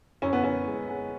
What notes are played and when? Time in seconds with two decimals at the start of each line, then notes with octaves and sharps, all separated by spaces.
0.22 F#2 C#4
0.33 B3
0.44 F#2 C#4
0.67 G#3
0.89 G#3